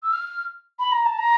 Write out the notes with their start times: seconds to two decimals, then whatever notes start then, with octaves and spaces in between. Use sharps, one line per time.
0.03 E6
0.13 F6
0.79 B5
0.92 A#5
1.06 A5
1.18 A#5